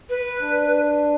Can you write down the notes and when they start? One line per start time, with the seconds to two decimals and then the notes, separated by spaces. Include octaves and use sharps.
0.09 B4
0.40 D4